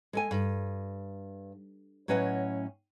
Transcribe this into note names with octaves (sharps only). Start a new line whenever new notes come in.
G#3 A4 G#5
G2
A2 F#3 C#4 B4 D#5 F#5